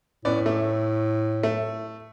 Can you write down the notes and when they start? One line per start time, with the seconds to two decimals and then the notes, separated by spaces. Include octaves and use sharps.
0.25 A2 B3 C#4 D5
0.46 A3
1.43 A3